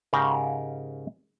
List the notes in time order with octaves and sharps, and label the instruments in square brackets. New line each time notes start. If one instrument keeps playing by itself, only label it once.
[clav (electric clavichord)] G#2 C#3 G4 A#4 F5